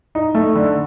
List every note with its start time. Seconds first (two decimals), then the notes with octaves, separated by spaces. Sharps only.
0.15 D#4
0.35 A3
0.55 D3